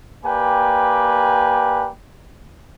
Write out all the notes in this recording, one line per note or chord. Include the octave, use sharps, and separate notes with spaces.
A#3 G4 B4 D5 G5 G#5